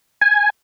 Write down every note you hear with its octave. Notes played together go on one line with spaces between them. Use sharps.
G#5